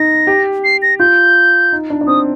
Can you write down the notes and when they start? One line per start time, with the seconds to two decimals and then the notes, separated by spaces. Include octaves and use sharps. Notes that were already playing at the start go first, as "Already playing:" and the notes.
Already playing: D#4 A#6
0.27 G4
0.64 C7
0.82 A#6
1.00 F4 G6
1.72 D#4
1.90 D4
2.01 D4
2.07 C4 D#6